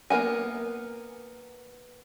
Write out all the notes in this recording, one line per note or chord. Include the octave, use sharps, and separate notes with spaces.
A#3 B3 A#4 F#5 G#5